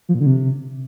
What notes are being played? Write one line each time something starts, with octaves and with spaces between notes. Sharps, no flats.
F3
A#2
D3
C3